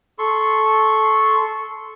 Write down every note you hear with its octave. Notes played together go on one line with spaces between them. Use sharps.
A4 C6 C#6